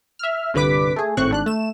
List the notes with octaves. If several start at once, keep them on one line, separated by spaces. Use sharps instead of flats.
E5 F6
C2 G2 D3 B4 D6 B6
A3 G#4
G#1 A2 C4 C#6 F#6
G#1 D4 F#6
A3 E7